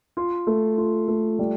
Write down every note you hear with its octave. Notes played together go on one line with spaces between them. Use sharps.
F4
A3
F4
A3
G3